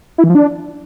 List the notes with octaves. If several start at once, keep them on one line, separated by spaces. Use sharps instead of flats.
E4
E3
F3
D4